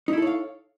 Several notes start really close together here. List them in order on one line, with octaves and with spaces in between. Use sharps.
D#4 E4 A4 C#5 F5